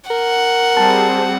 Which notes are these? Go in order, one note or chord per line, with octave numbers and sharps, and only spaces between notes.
A#4 F#5
G3 C4 G#4 A5